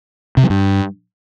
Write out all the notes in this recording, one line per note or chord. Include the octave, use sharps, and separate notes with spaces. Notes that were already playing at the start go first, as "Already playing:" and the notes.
C3
F#3
G2